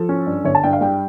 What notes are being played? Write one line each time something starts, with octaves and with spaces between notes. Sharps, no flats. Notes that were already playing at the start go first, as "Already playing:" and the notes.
Already playing: F3 A4
C#4
G2
G1 C#5
A5
G2 G5
F5
G3 G5